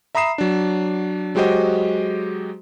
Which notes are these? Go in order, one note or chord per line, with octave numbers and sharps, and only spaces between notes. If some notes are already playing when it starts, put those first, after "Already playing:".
E5 A#5 B5 D#6 C7 E7
F#3 D4
F#3 G#3 F#4 G4 C5 D#5